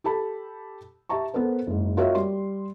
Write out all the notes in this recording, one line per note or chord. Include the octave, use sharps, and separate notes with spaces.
G4 A4 A5 B5
G4 E5 A5 A#5 C#6
B3 A4 A#4 C5
F#1 G#2
F4 F#4 A#4 C#5 D#5 E5
G3 C6